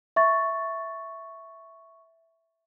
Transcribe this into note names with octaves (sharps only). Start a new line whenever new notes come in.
E5 C#6 A6